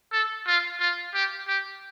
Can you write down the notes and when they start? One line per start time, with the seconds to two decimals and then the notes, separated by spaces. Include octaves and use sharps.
0.12 A4
0.47 F4
0.80 F4
1.14 G4
1.48 G4